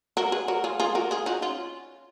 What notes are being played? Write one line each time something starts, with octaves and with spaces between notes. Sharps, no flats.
F#4 A#4
G#4 B4
F#4 A#4
F4 G#4
F4 G#4
F#4 A#4
F4 G#4
D#4 F#4
C#4 F4